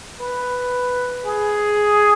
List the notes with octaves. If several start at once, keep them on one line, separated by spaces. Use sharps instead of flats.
B4
G#4